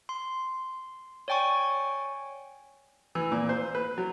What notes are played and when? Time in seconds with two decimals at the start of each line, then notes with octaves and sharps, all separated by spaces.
0.09 C6
1.28 C#5 D5 G5 G#5 C#6
3.15 E3
3.32 A#2
3.49 C5
3.75 B4
3.98 F#3